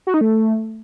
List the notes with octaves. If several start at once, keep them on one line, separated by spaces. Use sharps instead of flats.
F#4
D#4
A3